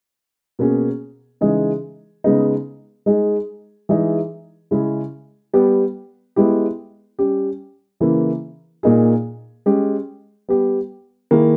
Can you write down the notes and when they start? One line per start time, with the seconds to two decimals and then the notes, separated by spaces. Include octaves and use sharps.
0.59 B2 A#3 C#4 G#4
1.41 C#3 E3 G#3 D#4 G#4
2.24 C#3 G#3 B3 D#4
3.06 G#3 D#4 G#4
3.89 E3 G#3 D#4 G#4
4.71 C#3 G#3 C#4 E4 G#4
5.53 G3 B3 G4
6.36 G#3 B3 E4 G4
7.19 G3 C#4 G4
8.00 C#3 E3 A#3 E4
8.83 A#2 A#3 D#4 G#4
9.66 G#3 C#4 G4
10.49 G3 B3 G4
11.31 D#3 A#3 E4 G#4